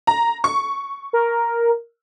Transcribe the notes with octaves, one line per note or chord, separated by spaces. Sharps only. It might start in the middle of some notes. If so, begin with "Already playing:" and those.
A#5
C#6
A#4